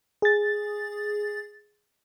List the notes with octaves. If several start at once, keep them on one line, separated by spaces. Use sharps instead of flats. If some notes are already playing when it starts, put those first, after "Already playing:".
G#4 A6